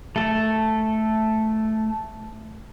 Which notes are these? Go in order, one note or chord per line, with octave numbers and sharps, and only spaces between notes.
A3 A4